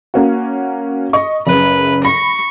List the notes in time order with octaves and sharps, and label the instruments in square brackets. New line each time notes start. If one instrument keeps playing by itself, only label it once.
[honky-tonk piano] A#3 C#4 F#4
D#5 C#6
[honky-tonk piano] F#1 C#3 [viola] B4
[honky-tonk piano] B5 A#6 [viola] C#6